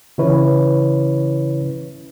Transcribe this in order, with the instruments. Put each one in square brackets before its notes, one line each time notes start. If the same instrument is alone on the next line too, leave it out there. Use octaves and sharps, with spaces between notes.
[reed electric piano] C#3 E3 C#4 E4 B4 C#5